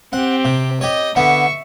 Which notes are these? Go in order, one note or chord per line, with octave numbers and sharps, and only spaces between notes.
C4 G4 F#5
C3
G4 C#5 D#5
D3 B3 E5 C#6